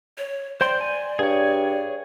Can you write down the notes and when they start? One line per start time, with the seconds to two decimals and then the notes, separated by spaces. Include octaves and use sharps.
0.18 C#5
0.61 C5 D5 G5 C6
0.81 G#5
1.19 G2 G#4 C#5